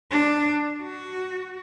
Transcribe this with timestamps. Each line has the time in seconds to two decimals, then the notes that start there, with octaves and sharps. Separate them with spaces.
0.11 D4
0.83 F#4